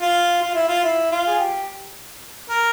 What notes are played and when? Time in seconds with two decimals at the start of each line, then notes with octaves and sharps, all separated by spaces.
0.01 F4
0.42 F4
0.54 E4
0.68 F4
0.84 E4
1.12 F4
1.27 G#4
1.39 G4
2.50 A#4